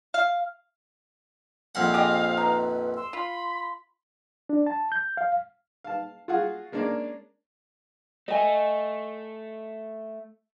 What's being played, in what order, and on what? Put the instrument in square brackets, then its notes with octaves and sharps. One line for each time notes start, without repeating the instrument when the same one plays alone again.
[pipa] F5
[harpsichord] A#1 F2 F#5 [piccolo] F5
[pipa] G4 G#4 D#5
[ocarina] C5
[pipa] D#4 [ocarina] B4
[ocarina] C6 [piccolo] E6
[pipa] F4 [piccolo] B5
[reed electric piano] D4
A5
G6
F5
[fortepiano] F5 A5
F4 F#4 G#4 F5 F#5
G#3 A#3 C#4 D4 A#4 D5
[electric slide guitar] A3 [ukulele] D#5 G#5